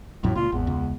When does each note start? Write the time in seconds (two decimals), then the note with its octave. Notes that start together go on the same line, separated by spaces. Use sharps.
0.23 A#1 F2 A2 F#3
0.35 C#2 A#2 F4
0.52 G#1 E2
0.67 C#2